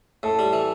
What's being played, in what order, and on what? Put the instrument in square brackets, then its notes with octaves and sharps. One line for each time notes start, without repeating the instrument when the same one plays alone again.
[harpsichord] A2 [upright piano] A4
[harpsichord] G3
E3